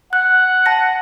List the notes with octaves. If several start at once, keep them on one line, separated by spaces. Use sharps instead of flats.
F#5 F#6
A5 A#6